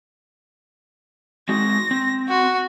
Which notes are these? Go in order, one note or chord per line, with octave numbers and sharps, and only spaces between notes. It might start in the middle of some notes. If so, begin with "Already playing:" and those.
G#3 C4 F#4 A#6
C4
F#4